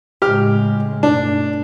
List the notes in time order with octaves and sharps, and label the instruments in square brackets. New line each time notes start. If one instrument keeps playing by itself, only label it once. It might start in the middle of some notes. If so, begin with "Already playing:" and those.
[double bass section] A2 C#3 G#3 [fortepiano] G4 F6
[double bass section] G2 B2 A3 [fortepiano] D4